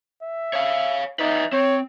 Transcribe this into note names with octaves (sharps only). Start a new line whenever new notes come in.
E5
C#5 F5
D#4 B4 D5 E5
C4 C#5